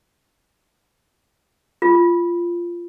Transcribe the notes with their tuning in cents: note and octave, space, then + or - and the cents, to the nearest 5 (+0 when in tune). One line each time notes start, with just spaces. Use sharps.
F4 -10